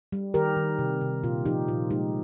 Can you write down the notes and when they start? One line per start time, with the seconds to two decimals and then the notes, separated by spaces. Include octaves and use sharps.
0.12 G3
0.34 D#3 G4 A#4
0.56 D#3
0.79 C3
1.01 C3
1.23 A#2 F4
1.45 F3 D#4 G4
1.68 A#2 F4
1.90 G#3 D#4 G4